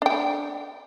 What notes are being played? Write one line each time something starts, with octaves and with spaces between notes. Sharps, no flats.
D4 G5